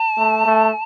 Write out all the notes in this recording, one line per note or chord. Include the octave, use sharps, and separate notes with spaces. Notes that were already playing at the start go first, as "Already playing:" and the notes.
Already playing: A5
A3
A3